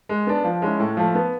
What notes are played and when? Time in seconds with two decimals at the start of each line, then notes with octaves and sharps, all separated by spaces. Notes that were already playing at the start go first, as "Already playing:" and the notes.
0.09 G#3
0.27 B3 D4
0.44 F3
0.62 G#3 C#4 E4
0.80 A2
0.97 F3 A3
1.15 B3